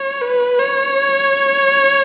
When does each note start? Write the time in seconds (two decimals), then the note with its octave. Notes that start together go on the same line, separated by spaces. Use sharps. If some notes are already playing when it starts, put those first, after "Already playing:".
Already playing: C#5
0.21 B4
0.60 C#5